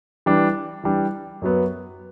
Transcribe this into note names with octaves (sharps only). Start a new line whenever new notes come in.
E3 G3 D4
E3 G3 D4
F#2 F#3 B3